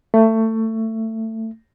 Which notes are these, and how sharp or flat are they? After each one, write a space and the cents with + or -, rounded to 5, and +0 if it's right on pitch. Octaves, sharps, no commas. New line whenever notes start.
A3 +20